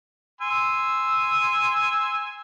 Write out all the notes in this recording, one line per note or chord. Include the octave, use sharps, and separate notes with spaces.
G#5 C6 E6